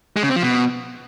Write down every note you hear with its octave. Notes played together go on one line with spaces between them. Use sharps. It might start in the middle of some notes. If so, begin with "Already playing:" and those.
G#3
C#3
C4
F3
B2